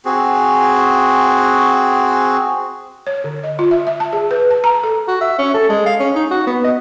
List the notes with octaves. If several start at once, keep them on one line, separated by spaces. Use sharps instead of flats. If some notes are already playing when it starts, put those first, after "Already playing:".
C4 F#4 G#4
C#5
D3
D#5
F4
E5
E5
A5
G#4
B4
A5
A#5
A4
F#4
E5
C#4
A4
G#3
F5
C#4
D#4
F#4
B3
D#5